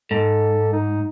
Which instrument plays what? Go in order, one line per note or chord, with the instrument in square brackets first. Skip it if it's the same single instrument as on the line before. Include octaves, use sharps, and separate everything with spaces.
[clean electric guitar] G#2 [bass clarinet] A4
[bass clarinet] D#4